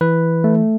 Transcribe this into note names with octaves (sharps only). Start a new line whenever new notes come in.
E3 B4
A3